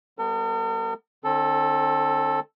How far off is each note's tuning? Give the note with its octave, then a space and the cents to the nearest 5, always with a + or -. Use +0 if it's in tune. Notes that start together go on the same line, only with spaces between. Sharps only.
G3 +0 B3 +0 A#4 -45
D3 +40 C4 +40 A4 +0